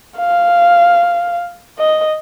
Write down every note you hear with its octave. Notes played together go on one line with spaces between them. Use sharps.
F5
D#5